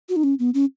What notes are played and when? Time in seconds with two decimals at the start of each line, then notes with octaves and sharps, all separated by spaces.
0.09 F#4
0.16 D#4
0.23 C#4
0.39 B3
0.54 C#4